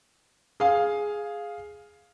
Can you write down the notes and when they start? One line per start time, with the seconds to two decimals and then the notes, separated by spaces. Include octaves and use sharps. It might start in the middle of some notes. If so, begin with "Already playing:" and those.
0.60 G#4 F5